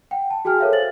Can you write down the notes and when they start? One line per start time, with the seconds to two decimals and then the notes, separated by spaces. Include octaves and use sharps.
0.11 F#5 G5
0.31 A5
0.45 F#4 G#4 G5 G#5 F6
0.60 A4 A#4 C#5 E5 F5
0.73 C5 A6 F#7